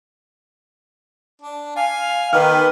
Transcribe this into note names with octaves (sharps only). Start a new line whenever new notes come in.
D4
F5 G#5
D#3 B3 G4 B4 F6